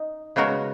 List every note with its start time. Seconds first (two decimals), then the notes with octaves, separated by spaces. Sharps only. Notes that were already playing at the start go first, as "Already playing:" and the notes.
Already playing: D#4
0.36 C#3 G#3 B3 F#4 A#4